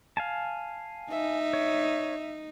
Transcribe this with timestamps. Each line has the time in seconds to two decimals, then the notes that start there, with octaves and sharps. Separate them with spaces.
0.17 F5 G#5 A5
1.11 D#4 E5
1.53 C#5